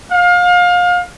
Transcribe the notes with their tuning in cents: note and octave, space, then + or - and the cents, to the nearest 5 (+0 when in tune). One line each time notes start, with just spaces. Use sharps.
F5 +30